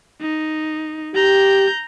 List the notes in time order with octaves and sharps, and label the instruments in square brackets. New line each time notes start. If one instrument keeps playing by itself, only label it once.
[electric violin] D#4
[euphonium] G4 [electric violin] A#5 G6